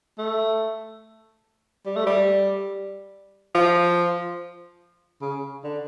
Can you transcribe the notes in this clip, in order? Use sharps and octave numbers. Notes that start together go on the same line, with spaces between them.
A3
G3
A3
G3
F3
C#3
D3